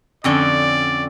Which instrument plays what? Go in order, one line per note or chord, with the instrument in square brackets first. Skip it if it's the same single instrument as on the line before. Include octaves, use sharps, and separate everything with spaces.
[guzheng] F2 D3 C#4 [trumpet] D5